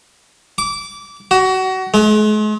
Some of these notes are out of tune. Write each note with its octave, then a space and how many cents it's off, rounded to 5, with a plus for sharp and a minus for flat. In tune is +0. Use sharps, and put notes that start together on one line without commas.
D6 -20
F#4 +25
G#3 +45